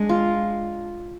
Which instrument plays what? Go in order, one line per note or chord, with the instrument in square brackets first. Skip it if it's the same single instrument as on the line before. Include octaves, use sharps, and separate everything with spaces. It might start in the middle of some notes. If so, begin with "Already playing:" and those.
Already playing: [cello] G#3 [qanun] D4
[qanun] F4